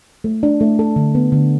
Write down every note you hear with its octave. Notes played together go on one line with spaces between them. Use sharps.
A3
D4
A3
A4
D3
B3
D3